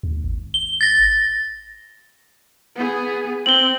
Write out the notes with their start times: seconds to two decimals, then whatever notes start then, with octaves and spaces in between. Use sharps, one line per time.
0.03 D#2
0.24 G#1
0.54 G7
0.81 A6 A#6
2.76 B3 G#4
3.46 C4 F#7 G7